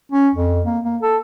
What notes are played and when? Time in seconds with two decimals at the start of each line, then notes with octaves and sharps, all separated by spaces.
0.12 C#4
0.35 F2
0.66 A#3
0.84 A#3
1.02 A4